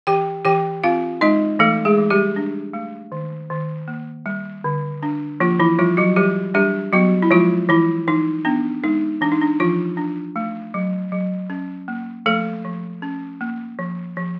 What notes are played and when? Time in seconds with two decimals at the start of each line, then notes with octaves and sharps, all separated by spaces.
0.07 E3 G4 G5
0.45 E3 G4 G5
0.84 C4 F4 F5
1.21 G#3 D#4 D#5
1.59 E3 A3 A4
1.85 G#3 G#4
1.98 E3
2.10 G3 G4
2.36 D4
2.73 A3
3.12 D#3
3.50 D#3
3.88 A#3
4.26 G3
4.64 D3
5.03 D4
5.40 F3 A#3 F4
5.59 E3 E4
5.79 F3 G3 F4
5.97 F#3 F#4
6.16 E3 G3 G4
6.54 G3 D4 G4
6.93 F#3 B3 F#4
7.22 E4
7.31 F3 G#3 F4
7.69 E3 E4
8.08 E3 D#4
8.45 B3 D4
8.84 G#3 D#4
9.21 E3 D4
9.32 D#4
9.41 D4
9.60 E3 F3 F4
9.97 D4
10.36 A3
10.74 F#3
11.12 F#3
11.50 C#4
11.88 A#3
12.26 F3 A3 A4
12.65 F3
13.02 C#4
13.41 A#3
13.79 F3
14.17 F3